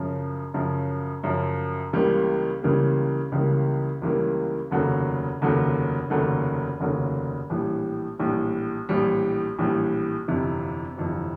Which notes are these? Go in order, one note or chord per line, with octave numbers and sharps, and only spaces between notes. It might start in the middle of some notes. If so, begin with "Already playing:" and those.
Already playing: F#2 C#3 F3
F#2 C#3 F3
F#2 C#3 F3
C#2 C#3 E3 G3 A#3
C#2 C#3 E3 G3 A#3
C#2 C#3 E3 G3 A#3
C#2 C#3 E3 G3 A#3
F1 D#2 C#3 F#3 A3
F1 D#2 C#3 F#3 A3
F1 D#2 C#3 F#3 A3
F1 D#2 C#3 F#3 A3
A#1 A2 E3 G3
A#1 A2 E3 G3
A#1 A2 E3 G3
A#1 A2 E3 G3
G1 F2 C3 E3
G1 F2 C3 E3